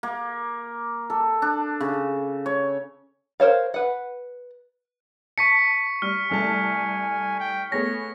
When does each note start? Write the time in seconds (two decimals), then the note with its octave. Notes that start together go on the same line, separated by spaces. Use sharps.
0.03 A#3
1.10 A4
1.42 D4
1.81 C#3
2.46 C#5
3.40 A#4 C5 C#5 F5
3.74 B4 F#5
5.38 A5 C#6 B6 C#7
6.02 G3 F6
6.31 C2 A3 G#5 A5
7.40 G5
7.72 A3 B3 G#4 C#5 A#6